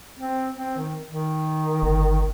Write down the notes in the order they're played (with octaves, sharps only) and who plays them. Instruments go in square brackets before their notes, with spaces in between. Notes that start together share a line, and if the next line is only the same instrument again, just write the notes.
[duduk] C4
C4
D#3
D#3
[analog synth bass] G1